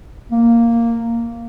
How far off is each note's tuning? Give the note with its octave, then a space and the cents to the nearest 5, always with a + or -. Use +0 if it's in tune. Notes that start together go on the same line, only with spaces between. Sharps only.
A#3 -5